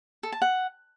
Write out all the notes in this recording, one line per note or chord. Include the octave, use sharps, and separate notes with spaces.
A4
A5
F#5